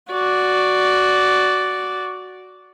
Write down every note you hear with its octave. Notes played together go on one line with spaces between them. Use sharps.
F#4 D5